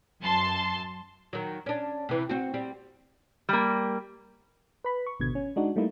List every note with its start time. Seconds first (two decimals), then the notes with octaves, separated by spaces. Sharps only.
0.22 F#2 A5 C6
1.33 D#3 F#3
1.66 C#4 D4
2.09 C3 E3
2.29 C4 F#4
2.54 G3 C4
3.49 G3 A#3
4.84 B4 B5
5.06 C#6
5.20 G#1 B2 D3 G#6
5.35 C#4
5.56 G#3 D4 D#4 F#4
5.76 G3 A3 A#3 D#4 E4